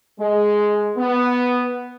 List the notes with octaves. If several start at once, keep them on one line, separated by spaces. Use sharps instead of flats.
G#3
B3